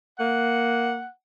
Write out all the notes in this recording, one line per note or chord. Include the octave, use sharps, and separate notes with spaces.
A#3 F#5